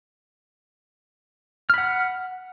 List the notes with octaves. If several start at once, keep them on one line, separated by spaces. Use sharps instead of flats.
F#5 B5 F6